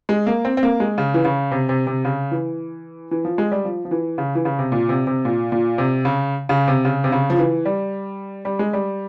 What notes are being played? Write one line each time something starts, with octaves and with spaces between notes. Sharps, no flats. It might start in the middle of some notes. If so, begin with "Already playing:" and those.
G#3
A#3
C4
C4
A#3
G#3
C#3
E3
C#3
C3
C3
C3
C#3
E3
E3
F3
G#3
G3
F3
F3
E3
C#3
E3
C#3
C3
A#2
C3
C3
A#2
A#2
C3
C#3
C#3
C3
C#3
C3
C#3
F3
E3
G3
G3
G#3
G3